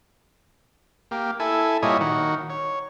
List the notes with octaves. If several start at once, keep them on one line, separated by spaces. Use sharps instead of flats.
A#3 G4
E4 A4 G#5
A#2 G3 E4 C#5 D#5 G#5
D#3 F#4
C#5